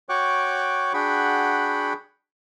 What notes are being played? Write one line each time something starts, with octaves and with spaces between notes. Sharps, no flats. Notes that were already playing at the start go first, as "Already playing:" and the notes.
F#4 C#5 G5 C#6 D6 F#6
D4 F#4 G#4 F#5 G5 B5